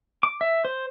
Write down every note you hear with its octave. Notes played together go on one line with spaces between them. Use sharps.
D6
E5
C5